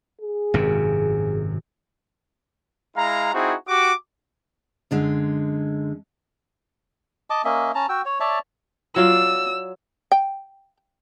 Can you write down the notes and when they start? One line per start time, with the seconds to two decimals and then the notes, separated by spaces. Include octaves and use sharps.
0.21 G#4
0.54 G#1 F#2 C3
2.97 G#3 E4 F5 A#5
3.33 C4 D#4 E4 F#4 G#4
3.68 F#4 G4 D6
4.91 F#2 D3 G#3
7.30 D#5 A5 D6
7.45 A#3 C#4 D#5 E5
7.75 C#4 A5 A#5
7.89 F#4 G5 E6
8.05 C#5
8.20 C#5 D5 E5 A5
8.96 F#3 F4 D5 E6
10.12 G5